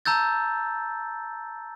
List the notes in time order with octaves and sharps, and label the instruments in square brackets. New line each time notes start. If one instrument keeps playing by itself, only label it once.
[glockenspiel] A5 A#5 E6 G6 A6